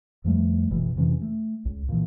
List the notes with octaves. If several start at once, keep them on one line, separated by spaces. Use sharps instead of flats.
F2 F3 G3 A3
F#1 B2 E3
F2 C3 E3 C#4
A3
C#2
A#2 E3